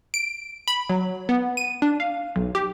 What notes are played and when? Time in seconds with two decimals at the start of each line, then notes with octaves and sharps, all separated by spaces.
0.14 D7
0.68 B5
0.89 F#3
1.29 B3
1.57 D#7
1.82 D4
2.00 F5
2.36 B1
2.55 G4